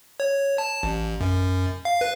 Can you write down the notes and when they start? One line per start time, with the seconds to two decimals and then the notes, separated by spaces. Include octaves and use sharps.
0.20 C#5
0.58 A5
0.83 A1
1.21 F#2
1.85 F5
2.01 B4